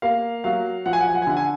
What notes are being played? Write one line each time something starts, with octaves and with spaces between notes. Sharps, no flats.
A#3 F5
F#3 F5
F3 F#5
G#5
F#5
G#5
F#5
G#5
D3 F#5
G#5